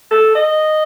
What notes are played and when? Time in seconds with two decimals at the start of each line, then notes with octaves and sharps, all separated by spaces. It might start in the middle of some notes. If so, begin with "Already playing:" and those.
0.11 A4
0.35 D#5